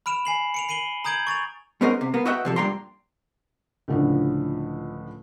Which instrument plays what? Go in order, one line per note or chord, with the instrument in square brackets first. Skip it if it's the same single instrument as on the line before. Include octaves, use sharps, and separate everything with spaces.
[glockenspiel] B5 F6 D7 E7 F7
G#5 C7 F#7
C#7 D7 F7
C7 D7 D#7 F#7 G7
A#5 D#6 G6 G#6 D7 F#7
C#6 A6 D7 F7
[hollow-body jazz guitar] G#2 B3 C#4 A#4 C5 D#5
C3
A#3 B3
F#4 B4 D#5 E5 F#5 G5
C3 F3 A4
G2 A#2 G5 A#5 C6
[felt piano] C#2 A2 D3 F3